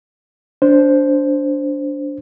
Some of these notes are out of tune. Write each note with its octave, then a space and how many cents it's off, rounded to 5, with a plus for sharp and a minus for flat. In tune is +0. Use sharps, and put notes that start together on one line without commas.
D4 -20 C5 +0